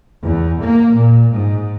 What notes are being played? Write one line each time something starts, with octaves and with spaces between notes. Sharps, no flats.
E2
A#3
A#2
G#2